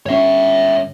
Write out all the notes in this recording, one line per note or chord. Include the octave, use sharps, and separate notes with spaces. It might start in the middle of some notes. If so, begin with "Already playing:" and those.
G1 C#4 C#5 E5